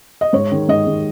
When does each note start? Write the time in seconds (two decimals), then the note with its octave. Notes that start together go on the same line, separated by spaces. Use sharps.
0.21 D#5
0.33 G#2 C#5
0.52 D#3 G#3
0.68 G#2 D#5
0.86 D#3 G#3